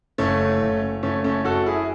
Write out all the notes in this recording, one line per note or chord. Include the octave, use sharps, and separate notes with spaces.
F#1 A3 C#4
F#1
F#1 A3 C#4
A3 C#4
F#2 F#4 A4
E4 G#4